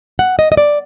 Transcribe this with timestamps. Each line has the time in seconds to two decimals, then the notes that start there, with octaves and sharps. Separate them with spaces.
0.19 F#5
0.39 D#5
0.52 D#5
0.57 D5